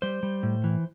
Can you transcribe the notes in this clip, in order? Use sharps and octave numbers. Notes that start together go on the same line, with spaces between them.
G3 C5
G3
A2
E3